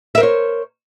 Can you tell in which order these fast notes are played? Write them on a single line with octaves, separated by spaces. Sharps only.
E5 A#4 C5 C#5